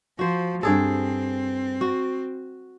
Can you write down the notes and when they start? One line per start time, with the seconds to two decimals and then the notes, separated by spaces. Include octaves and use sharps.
0.19 F3 F#4 C5
0.63 G2 C4 G#4 A4
1.81 F#4